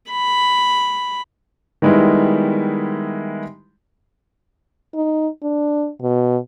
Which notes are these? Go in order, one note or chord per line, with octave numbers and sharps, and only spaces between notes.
B5
D#3 G3 G#3 B3 E4
D#4
D4
B2